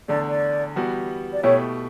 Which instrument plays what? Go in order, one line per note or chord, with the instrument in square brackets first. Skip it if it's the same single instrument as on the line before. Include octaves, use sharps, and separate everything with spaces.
[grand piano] E2 D3 A3 [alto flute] D5
[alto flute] D5
[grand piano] E3 G3 B3 F#4
[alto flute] D5
[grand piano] B2 A3 E4 G4 B4 [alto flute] C#5